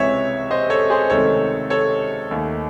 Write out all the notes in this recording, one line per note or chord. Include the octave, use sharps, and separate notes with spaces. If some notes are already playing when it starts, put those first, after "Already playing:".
Already playing: C#2 C3 E3 C#5 E5
C5 D#5
A4 C#5
G#4 C5
C#2 C3 D#3 A3 A4 C#5
A4 C#5
D#2 D#3 A3